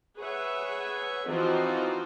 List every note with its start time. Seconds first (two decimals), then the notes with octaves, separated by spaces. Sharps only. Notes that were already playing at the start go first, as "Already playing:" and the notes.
0.18 G#4 B4 C#5 E5 F#5
1.27 E3 F3 C4 D#4 F4 F#4